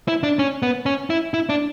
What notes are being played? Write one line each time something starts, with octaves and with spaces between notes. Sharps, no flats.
E4
D4
C#4
B3
C#4
E4
E4
D4